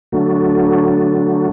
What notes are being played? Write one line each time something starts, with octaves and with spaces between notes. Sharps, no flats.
D3 F#3 A3